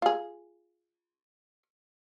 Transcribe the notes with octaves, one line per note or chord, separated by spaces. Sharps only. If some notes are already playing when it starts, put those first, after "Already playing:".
F4 G#4